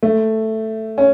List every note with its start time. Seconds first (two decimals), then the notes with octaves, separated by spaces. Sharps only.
0.03 A3
0.98 C#4